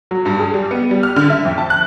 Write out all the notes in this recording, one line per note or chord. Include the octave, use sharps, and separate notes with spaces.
F#3
G2
G#4
G3
B3
G3
F6
D3
E5
F2
A5
F#6